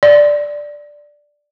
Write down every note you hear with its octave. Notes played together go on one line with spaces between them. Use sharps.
D5